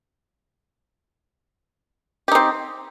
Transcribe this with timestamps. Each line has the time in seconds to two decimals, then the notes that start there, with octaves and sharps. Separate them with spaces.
2.28 G4
2.32 D#4
2.35 C4